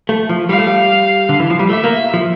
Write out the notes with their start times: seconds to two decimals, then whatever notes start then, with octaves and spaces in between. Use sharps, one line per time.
0.09 A3
0.29 F3
0.49 G3 F5
0.58 A3
0.67 G3
1.29 D3
1.40 E3
1.50 F3
1.59 G3
1.69 A3 E5
1.84 A#3
2.14 F3